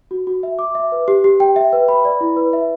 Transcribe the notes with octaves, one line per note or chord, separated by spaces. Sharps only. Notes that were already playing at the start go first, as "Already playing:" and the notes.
F#4
F#4
E5
D6
E5
B4
G4
G4
G5
E5
B4
B5
D5
E4
B4
E5